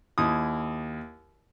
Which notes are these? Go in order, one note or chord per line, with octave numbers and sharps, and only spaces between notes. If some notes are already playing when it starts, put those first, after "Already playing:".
D#2 E4 D#6